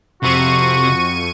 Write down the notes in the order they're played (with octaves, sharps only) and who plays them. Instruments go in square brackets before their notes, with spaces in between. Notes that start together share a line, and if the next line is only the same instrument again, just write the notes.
[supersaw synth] F2 C#6 D#7 [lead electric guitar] C3 C4 [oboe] F#4